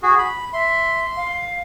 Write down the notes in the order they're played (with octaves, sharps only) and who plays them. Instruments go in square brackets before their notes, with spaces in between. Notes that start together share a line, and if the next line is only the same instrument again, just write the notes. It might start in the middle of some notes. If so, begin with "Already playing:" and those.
[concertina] F#4 G#4
B5
[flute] E5 [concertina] C6
[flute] F5